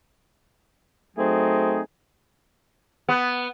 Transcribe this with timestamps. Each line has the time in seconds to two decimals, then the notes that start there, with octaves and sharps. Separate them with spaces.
1.17 F#3 A3 C4 D#4 G#4
3.09 B3